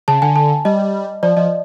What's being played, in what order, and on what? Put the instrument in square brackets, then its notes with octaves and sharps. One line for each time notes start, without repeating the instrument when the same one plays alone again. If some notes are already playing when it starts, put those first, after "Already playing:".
[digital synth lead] C#3 [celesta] A5
[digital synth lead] D3 [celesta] G#5
[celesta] A5
[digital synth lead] G3 [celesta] D#5
[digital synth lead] F3 [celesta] D5
[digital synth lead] F3 [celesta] D#5